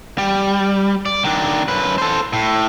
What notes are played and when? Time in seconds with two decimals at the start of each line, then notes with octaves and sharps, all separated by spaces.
0.18 G3
1.06 D5
1.24 D#3 D4
1.68 F#2 B4
1.98 A4 C5
2.33 A2